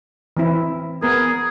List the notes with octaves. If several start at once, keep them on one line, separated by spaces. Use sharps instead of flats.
E3 C4 E4
B3 G#4 A#4